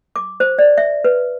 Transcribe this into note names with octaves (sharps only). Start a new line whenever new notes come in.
D6
C5
D5
E5
B4